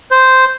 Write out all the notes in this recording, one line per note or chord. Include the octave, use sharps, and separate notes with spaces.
C5